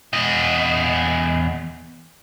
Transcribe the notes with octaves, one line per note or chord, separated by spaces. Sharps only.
E2 D#5